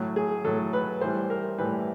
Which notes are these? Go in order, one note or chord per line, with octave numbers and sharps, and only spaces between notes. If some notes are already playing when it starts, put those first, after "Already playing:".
Already playing: A2 F#3
G#4
A2 F#3 A4
B4
A2 E3 G3 C5
A#4
A2 E3 G3 B4